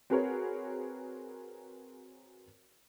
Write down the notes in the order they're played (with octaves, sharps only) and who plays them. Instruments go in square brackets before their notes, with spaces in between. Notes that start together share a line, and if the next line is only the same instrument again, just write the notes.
[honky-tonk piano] C4 F#4 G#4 A#4 B4 C#5